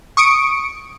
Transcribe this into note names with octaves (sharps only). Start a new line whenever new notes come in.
C#6 D#6 C#7 D7